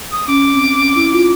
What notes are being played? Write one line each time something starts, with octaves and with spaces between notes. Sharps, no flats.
D#6
C#4 D6
C4
C#4
E4
F4